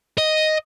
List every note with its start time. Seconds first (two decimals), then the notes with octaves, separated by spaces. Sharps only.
0.18 D#5